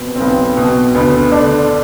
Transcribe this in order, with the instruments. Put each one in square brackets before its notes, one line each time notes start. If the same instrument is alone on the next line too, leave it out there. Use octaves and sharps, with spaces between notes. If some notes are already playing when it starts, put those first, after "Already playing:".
Already playing: [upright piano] B2 B3 C4
C4
B1 B3
B2
D2 B3
D3 D4